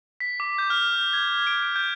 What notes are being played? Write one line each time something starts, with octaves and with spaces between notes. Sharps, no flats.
B6
D6
G6
F6
G#6
D7
G6